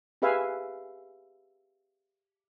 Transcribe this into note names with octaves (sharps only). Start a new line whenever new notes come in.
G4 G#4 B4 E5 F5 G#5